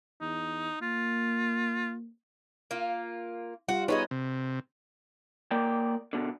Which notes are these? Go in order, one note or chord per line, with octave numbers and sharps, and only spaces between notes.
E2 D#4
A#3 F4
A#3 F4
G3 F4 F#4
B3 D#4 G#4 B4 C#5 D#5
C3
A#3 D5 G5
B2 D3